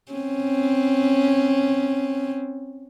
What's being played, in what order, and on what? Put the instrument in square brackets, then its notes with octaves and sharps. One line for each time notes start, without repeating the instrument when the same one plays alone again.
[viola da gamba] C4 C#4